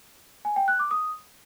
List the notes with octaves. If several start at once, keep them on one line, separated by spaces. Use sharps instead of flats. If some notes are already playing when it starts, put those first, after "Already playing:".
G#5
G5
F#6
D6
D#6